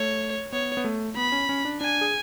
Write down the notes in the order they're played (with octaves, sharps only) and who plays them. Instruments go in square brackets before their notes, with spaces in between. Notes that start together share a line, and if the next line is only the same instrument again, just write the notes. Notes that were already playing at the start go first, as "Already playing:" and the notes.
Already playing: [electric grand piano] A3 [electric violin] C#5
[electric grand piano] B3 [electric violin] C#5
[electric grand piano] B3
A3
[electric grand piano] B3 [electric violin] B5
[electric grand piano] C#4
C#4
D4
[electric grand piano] D4 [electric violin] G#5
[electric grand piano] G#4